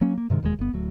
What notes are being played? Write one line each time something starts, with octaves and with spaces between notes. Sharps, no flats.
F#3 A#3 C#4
A#3
G2 C3 D#3 G#3
E1 D#2 C3 G#3
G1 B3
D1 A2 F#3